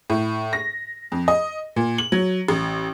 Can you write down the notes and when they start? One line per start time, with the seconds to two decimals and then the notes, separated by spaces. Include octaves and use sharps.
0.10 A2
0.53 A#6
1.12 F2
1.28 D#5
1.76 A#2
1.98 F#7
2.12 F#3
2.48 A1